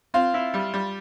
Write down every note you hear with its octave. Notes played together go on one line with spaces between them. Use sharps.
C4 F4
E4
G3
G3